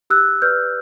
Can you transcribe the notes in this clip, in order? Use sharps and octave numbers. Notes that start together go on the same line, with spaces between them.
G4 E6 F#6
B4 D5 F6 G6